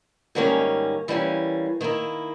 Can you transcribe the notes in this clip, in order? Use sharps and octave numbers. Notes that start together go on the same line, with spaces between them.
G#2 D#3 G3 A#3 C#4
E3 G3 A#3 C#4
D#3 A#3 E4